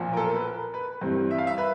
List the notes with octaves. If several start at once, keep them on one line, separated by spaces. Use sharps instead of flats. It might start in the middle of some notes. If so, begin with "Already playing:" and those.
Already playing: B1 A#2 F3
A#4
A4
B4
A#4
B4
G2 E3 G3 C4
E5
F5
E5
B4